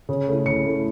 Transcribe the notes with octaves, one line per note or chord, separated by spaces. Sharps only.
C#3
A3 E4
C#3 C#7
A3 E4